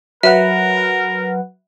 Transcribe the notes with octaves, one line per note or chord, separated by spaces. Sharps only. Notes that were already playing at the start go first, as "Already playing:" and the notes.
F#3 A#4 B4 E5 F#5